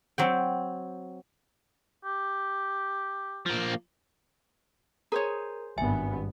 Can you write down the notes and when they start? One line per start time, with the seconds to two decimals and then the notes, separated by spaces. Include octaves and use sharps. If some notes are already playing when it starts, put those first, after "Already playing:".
0.18 F#3 C4 G5
2.05 G4
3.46 F3 A#3
5.12 G#4 A#4 C5 C#5 A#5
5.78 G#1 G2 B3 E5 G#5